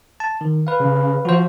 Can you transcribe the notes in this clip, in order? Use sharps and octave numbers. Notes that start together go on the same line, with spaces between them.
A5
D#3
B4 F5
C#3
F3 F#4 C5